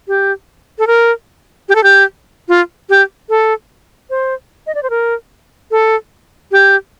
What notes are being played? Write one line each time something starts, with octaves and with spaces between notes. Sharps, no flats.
G4
A4
A#4
G4
A4
G4
F4
G4
A4
C5
D#5
D5
C5
A#4
A4
G4